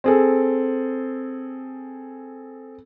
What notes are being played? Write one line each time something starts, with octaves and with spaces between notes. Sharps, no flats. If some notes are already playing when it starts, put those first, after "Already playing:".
C4 G#4 A4